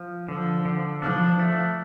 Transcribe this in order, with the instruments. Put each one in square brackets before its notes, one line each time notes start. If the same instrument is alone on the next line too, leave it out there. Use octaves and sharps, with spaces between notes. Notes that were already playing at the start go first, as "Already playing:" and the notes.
Already playing: [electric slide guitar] F3
[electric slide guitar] D3 [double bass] F3
[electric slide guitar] D3
[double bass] F3 [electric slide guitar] D4
[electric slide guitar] A3